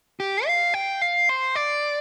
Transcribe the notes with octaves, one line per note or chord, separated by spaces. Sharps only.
G4
F5
G5
F5
C5
D5